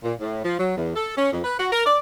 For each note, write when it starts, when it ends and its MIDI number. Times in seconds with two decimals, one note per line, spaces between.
0.04 0.14 46
0.20 0.43 45
0.44 0.58 53
0.59 0.76 54
0.77 0.93 40
0.96 1.14 69
1.17 1.32 61
1.32 1.40 41
1.44 1.56 71
1.59 1.67 66
1.72 1.83 70
1.86 1.98 74